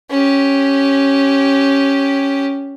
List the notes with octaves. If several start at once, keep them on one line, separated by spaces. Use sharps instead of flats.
C#4 G4